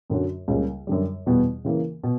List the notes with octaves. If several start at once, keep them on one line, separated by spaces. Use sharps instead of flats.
F#2 D3 F#3 C#4 F#4
C#2 C#3 G3 A#3
F#2 D3 G3
E2 B2 G3 B3
C#3 E3 A#3
B2